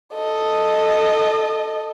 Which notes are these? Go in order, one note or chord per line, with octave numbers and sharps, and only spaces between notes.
A4 D#5